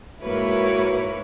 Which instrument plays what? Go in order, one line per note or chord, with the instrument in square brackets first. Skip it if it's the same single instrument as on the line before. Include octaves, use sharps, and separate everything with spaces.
[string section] G#2 A#3 B4 [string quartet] E4 C#5 [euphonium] F#4